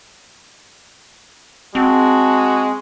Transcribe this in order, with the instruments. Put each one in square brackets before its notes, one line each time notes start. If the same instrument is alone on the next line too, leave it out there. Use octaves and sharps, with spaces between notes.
[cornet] G#3 [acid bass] C4 [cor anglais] F#4 [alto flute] A5